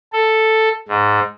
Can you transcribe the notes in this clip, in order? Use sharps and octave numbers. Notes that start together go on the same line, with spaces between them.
A4
G#2